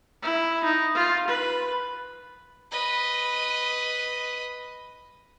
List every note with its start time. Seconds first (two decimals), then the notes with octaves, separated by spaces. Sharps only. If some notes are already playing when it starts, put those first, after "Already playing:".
0.22 E4
0.64 D#4
0.94 F4
1.27 B4
2.71 B4 D#5